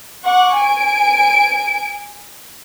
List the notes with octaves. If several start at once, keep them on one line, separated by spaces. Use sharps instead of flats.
F#5 C#6 D6
G#5 D7